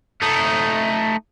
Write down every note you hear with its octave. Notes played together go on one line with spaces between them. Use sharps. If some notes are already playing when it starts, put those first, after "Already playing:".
A3 D#4